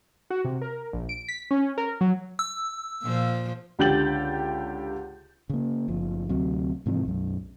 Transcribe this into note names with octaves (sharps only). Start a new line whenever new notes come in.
F#4
C3
A#4
A#1
D7
B6
C#4
A#4
F#3
E6
A#2 F3
C#2 D3 G4 G6 A6 F#7
C#3 A#3
F#1 F3
D2 C3 F#3
G#2 C3 E3 F3
B1 F#2